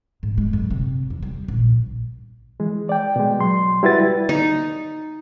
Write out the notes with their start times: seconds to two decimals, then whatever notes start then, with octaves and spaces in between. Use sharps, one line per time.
0.23 G#2
0.38 G#3
0.53 F#2
0.70 C3
1.10 E2
1.23 G3
1.48 A#1
2.60 E3 G#3
2.89 D5 G5
3.16 B2 G#3
3.39 F#3 C6
3.83 G3 E4 F#4 B4 A6
4.29 D#4